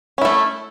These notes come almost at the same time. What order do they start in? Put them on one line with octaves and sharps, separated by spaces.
C#4 E4 A3